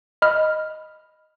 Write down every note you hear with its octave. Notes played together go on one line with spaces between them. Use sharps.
D#5 B5 F6